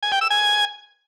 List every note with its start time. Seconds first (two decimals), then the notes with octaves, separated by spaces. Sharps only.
0.03 G#5
0.12 G5
0.21 E6
0.30 G#5